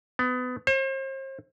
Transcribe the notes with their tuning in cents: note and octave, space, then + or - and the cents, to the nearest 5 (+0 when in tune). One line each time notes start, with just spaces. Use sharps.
B3 +25
C5 +40